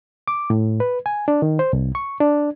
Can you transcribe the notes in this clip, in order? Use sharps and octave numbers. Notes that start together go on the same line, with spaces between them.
D6
A2
B4
G#5
D4
D#3
C5
C2
C#6
D4